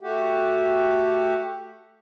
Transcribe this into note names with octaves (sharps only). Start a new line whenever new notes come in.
A3 F#4 G4